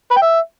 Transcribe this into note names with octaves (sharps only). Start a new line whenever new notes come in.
B4
G5
E5